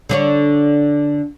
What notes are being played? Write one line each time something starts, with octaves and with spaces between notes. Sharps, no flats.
D3 D4 C#5